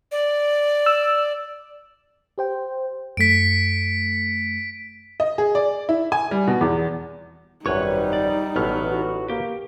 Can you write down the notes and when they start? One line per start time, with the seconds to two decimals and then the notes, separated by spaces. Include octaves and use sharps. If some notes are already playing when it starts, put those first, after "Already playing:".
0.12 D5
0.86 E6
2.38 G4 C5 G5
3.17 F#2 A3 B6 C#7 D7
5.20 D#5
5.38 G#4
5.55 D5
5.89 E4
6.12 G#5
6.31 G3
6.47 B2
6.61 E2
7.66 G#1 F#2 G3 D#4 B4 C#5 C#6
8.13 D5
8.56 A1 B2 E3 F#3 B3 F6
8.91 F#4
9.30 A#3 G4